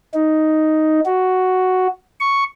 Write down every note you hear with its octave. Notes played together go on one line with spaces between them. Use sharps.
D#4
F#4
C#6